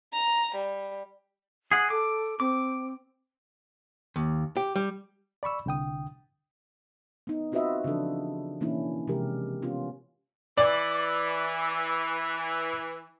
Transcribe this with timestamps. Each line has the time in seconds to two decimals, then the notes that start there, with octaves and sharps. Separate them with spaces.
0.13 A#5
0.55 G3
1.72 G#4 F#5
1.90 A4 D6
2.40 C4 D6
4.16 D#2
4.57 G4
4.76 G3
5.43 D5 B5 C#6 E6
5.66 C2 D3 G5 D#6
7.27 B3 D#4
7.52 C4 F4 F#4 B4 D#5 E5
7.84 C#3 E3 F3 D4 A4
8.60 B2 E3 A#3 C#4 D4 E4
9.08 C3 E3 F3 G#3 G4 A#4
9.62 B3 C#4 F4
10.58 E3 D5